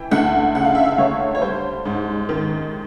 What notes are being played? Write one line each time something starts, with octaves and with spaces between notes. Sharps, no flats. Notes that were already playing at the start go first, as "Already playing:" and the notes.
Already playing: E3 G5
D2 F#5
C#3 F#5
F5
E5
F5
D2 C#5
C#5
G3 C5
G#2
D#3